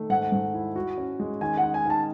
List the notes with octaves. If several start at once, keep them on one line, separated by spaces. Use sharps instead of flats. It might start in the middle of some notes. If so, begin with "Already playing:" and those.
Already playing: D#3 A3
G#2 F#5
G#2
E4
F#4
C#4
G#3
D#3 G#5
F#5
D#4
G#5
D#3 A5